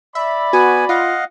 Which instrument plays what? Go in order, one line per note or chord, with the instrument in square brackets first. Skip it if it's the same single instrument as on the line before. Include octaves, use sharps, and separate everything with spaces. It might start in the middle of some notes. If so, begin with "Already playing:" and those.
[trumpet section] D5 B5 [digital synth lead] E5
[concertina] B3 G#5 [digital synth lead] F#4
[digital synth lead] F4 [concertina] D#5 F5 F#5